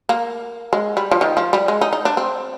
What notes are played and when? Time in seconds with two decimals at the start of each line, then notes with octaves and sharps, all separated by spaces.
0.09 A#3
0.73 G#3
0.97 G3
1.11 F3
1.21 D#3
1.37 F3
1.53 G3
1.68 G#3
1.81 D#4
1.93 D#4
2.05 D4
2.17 C4